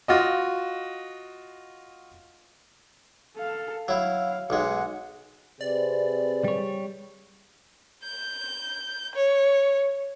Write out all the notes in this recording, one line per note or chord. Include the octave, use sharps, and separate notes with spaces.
F4 F#4 D#5
A4 F5
F#3 E4 F5
B1 G#3 F#5
C3 C4 G#4 B4 D5
G3 C#5
G6
C#5